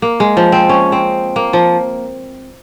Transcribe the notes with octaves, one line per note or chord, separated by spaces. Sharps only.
A#3
G#3
F3
C4
C#4
C4
A#3
F3